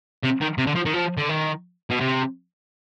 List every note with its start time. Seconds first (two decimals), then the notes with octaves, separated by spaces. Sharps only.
0.23 C3
0.41 D#3
0.58 C3
0.67 D3
0.76 F3
0.86 D#3
0.94 F3
1.18 D3
1.29 D#3
1.90 B2
2.00 C3